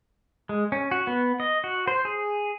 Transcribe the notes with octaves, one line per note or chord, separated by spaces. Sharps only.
G#3
C#4
F#4
B3
D#5
F#4
C5
G#4